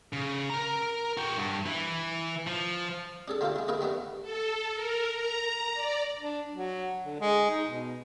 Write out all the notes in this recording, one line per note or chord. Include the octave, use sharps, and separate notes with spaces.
C#3
A#4 A#5
F#4 G5
G2
E3
F3
D4 G#4 A4
D3 A3 A#3 F4 G4 A4
G#3 E4
A#3 D#4 E4 G#4 A#4 B4
D#3 G3 A3 B3 B4
A4
A#4
A#5
D5
D4
F#3
D3
G#3
D#4
B2